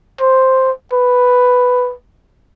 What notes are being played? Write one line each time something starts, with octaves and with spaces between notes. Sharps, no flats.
C5
B4